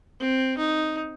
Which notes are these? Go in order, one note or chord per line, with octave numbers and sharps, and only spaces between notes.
C4
D#4